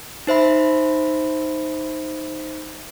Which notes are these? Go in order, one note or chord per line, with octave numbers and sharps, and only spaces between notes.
D#4 C5 E5 B5